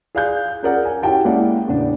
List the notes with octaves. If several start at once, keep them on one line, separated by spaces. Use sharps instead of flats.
G#4 D5 F5 G#5 F#6 G6
C#4 F4 G#4 A#4 D5 F#5
G#5
C#4 E4 F#4 G4 G5 A5
G#3 A#3 C#4 E4 D5 F#5
E2 A2 C#3 B3 D4